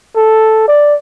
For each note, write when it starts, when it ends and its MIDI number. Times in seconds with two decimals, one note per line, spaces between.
0.16 0.65 69
0.68 0.95 74